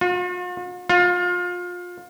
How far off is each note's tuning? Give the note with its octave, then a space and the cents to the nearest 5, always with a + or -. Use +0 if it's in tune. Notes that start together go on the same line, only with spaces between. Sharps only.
F4 +45
F4 +25